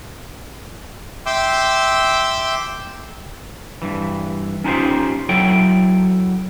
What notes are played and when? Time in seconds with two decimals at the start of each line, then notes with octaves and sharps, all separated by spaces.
1.26 E5 G5 C6 D6 E6
3.82 G2 E3
4.64 C#4 D#4 F4 G4 C5
5.29 F#3 E4 A4 C#5 G5